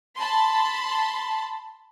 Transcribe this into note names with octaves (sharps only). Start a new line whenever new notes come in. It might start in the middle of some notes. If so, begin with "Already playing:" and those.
A5 B5 C6